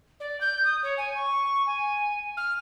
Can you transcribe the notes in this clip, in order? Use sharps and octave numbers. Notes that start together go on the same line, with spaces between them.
D5
G6
D#6
C#5
G#5
C#6
G#5
F6